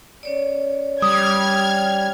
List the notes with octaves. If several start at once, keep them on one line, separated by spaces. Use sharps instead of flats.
C#4 C#5 D5
G3 D#6 F6 G#6